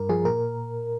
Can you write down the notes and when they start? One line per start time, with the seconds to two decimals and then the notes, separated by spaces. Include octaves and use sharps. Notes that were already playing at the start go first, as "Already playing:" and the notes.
Already playing: G2 A#4
0.09 F3 G#4
0.25 A#2 A#4